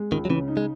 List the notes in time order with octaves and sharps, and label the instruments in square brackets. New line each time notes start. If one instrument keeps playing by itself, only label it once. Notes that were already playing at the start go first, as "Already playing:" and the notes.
Already playing: [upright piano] G#3
[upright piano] C#2 [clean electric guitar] D#3
[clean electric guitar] F#3
[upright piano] C#3 [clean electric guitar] E3
[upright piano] D#4
[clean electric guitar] G#3